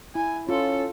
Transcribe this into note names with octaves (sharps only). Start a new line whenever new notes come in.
E4 G#5
C#4 F4 A4